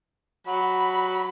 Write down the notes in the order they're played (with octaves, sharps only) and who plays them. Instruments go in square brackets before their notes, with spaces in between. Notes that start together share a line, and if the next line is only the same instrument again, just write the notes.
[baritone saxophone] F#3 [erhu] B5